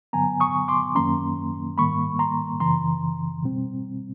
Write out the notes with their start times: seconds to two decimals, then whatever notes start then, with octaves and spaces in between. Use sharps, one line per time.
0.13 G2 D3 F#3 B3 G#5 A#5
0.40 C#6 D#6
0.68 C6 D6
0.95 F#2 D#3 F#3 A#3 C#4 A#5 C6
1.78 G#2 D#3 G3 A#3 B5 C#6
2.19 A#5 C6
2.60 F#2 C#3 E3 A#5 C6
3.43 B2 G3 C4